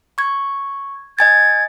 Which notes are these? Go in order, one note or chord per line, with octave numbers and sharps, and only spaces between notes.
C#6 G#6
D#5 G#5 G#6 A6